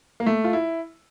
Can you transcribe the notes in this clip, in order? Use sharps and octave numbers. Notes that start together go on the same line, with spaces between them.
A#3
A3
F4
E4